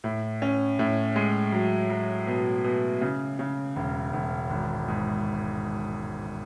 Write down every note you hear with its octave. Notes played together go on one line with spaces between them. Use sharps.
A2
C#4
A2
G#3
F#3
F#3
B2
B2
C#3
C#3
E1
E1
G#1
G#2